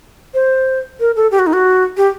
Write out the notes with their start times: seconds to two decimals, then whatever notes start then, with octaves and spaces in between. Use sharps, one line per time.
0.34 C5
1.00 A#4
1.16 A4
1.31 G4
1.39 F#4
1.47 D#4
1.54 F#4
1.97 G4